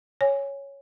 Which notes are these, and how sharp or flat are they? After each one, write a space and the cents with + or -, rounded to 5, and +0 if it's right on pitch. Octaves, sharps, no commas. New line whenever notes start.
C#5 +0 G#5 -5